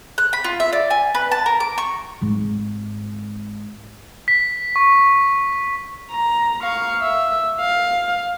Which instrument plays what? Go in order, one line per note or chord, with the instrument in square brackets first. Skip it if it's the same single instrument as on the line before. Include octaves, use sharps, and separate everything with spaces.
[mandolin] F#6
B5
F4
E5
D5
G#5
B4
A5
A#4
D6
C#6
[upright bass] G#1 G#2
[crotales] B6
C#6
[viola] A#5
F5 C#6
E5
F5